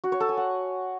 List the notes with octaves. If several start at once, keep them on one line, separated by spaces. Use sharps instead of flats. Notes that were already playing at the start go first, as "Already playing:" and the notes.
F#4
C#5
A4
G#5
F#5